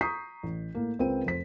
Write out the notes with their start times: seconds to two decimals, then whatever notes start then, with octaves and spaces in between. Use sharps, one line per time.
0.01 A#5 C#6 D#6 G6 B6 C7
0.43 A1
0.75 A2 A#3
0.99 C#2 C4 A#4 B4 G5 D#7
1.25 F1 C5 B6